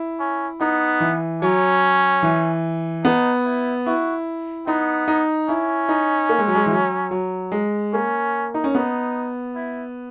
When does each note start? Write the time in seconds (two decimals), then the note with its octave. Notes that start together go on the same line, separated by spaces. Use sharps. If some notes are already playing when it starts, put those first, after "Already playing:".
Already playing: E4
0.19 C#4
0.61 B3 D#4
1.00 E3
1.42 F#3 C#4
2.23 E3
3.04 B3 D#4
3.45 E4
3.86 E4 F#4
4.67 B3 D#4
5.08 D#4
5.48 C#4 E4
5.89 D#4
6.29 A#3
6.39 G#3
6.48 F#3
6.55 G#3
6.66 E3
6.71 F#3
7.11 F#3
7.52 G#3
7.93 A#3 C#4
8.54 D#4
8.64 C#4
8.74 B3 D#4
9.55 E4